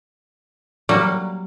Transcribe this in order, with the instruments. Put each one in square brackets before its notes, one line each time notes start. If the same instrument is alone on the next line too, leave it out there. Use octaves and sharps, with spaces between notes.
[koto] F#3 G3 A#3